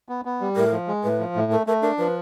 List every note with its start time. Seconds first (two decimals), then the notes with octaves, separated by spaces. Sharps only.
0.09 B3
0.25 B3
0.41 G3
0.56 A2 A#4
0.72 F3
0.88 G#3
1.04 A2 B4
1.19 F3
1.36 A2
1.51 A3 A#4
1.67 A3 A#4
1.82 D4 A#4
1.98 F3 B4